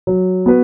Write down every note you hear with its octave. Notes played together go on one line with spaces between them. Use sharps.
F#3
B3 F#4 B4